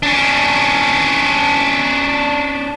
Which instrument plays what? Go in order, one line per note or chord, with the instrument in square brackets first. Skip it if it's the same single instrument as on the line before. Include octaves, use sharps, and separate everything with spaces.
[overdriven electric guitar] C#4 D4